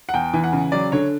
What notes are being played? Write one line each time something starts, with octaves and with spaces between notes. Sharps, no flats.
F#5
E2 G5
E3
F#5
C#3
F#3 D5
D3 C#5